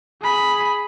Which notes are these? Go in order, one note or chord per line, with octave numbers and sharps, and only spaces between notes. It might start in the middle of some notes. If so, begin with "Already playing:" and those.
G#4 B5